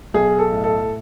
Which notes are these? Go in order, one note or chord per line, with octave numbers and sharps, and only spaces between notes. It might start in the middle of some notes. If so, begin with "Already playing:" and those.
B1 G#4
A4
A2
A4